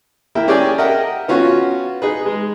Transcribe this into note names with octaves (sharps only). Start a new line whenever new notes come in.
A#3 E4 E5 G5
C#4 G4 G#4 D5 G5 G#5
A#4 D#5 E5 F#5 G5
B3 C#4 F4 F#4
D#4 G#4 B4
G#3